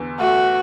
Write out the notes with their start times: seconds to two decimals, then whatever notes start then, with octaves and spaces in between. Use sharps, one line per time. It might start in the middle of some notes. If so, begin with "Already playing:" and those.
Already playing: E2 D3
0.19 A3 F#4